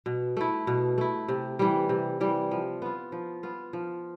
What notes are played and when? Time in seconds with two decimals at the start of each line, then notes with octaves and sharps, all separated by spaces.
0.06 B2
0.37 A3 E4
0.67 B2
0.98 A3 E4
1.28 C3
1.59 E3 G3
1.89 C3
2.20 E3 G3
2.51 F3
2.82 B3 F4
3.12 F3
3.43 B3 F4
3.73 F3